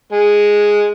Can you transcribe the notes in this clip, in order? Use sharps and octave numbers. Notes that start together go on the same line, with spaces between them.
G#3